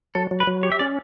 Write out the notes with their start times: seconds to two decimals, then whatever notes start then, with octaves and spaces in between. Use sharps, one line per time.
0.15 F#3 A4
0.31 F#3
0.40 B4
0.47 F#3
0.63 G4 C#5
0.72 E5
0.79 C#4 D5